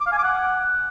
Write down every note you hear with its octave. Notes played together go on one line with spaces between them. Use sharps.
D6
F5
G#5
D6
F#5